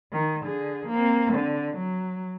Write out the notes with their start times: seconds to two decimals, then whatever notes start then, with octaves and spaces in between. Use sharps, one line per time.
0.13 D#3
0.45 D3 G#4
0.88 A#3 C4
1.34 D3
1.78 F#3